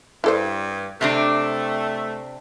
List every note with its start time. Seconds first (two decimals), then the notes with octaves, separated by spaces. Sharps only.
0.24 G2 E4 A4 C5
1.01 C3 A3 C4 D4